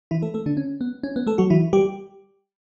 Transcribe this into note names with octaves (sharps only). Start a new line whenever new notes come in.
E3 E4
A3 A4
A3 A4
D3 D4
C#4
B3
C#4
B3
A3 A4
F#3 F#4
E3 E4
G3 G4